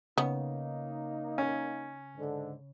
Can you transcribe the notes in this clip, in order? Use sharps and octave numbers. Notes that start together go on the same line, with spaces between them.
C#3 A#3 B3 D#4
C#4
G#2 D3